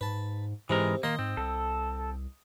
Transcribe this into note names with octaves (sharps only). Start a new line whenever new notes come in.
G#2 B4 A5
G#2 C3 E3 G#3 A#4
D#3 A#3 D#5 C6
G#2 C4
C2 A4